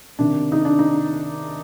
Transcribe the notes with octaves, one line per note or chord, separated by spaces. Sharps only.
C3 D#3 D4
D#4
D4
D#4